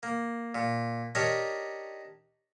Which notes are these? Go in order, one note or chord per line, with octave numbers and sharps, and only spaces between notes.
A#3
A#2
D4 D#4 G4 A#4 C#5